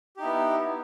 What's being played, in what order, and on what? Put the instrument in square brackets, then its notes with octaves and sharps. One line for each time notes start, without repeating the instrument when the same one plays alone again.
[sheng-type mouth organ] G4
D#4
E4
B3